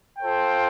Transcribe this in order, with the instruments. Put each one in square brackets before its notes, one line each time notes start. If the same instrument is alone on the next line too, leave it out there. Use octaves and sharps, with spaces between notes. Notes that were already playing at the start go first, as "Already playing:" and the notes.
[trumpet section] F4 A4 C5 G5